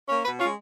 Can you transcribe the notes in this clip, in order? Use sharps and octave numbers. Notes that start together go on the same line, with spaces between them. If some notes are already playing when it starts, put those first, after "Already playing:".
A#3 C#4
B2 B4
G#3 C#4 F4